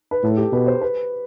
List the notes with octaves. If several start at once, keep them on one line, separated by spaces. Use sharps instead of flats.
B4
A2 A4
G4
B2 B4
C5
B4